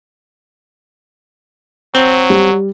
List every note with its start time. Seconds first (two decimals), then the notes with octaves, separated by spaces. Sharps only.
1.95 F#3 C4
2.30 G3